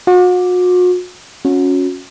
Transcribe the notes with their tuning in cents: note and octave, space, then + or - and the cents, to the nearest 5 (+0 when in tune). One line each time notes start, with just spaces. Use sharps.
F#4 -40 D6 +0
C#4 +0 F#4 -30